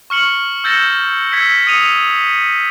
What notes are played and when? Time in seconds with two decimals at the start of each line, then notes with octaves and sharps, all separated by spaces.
0.10 C#6 F6 C#7 F#7
0.64 E6 G6 A6 A#6 C#7 E7
1.32 E6 G#6 B6 C#7
1.67 D#6 C#7 D#7 F7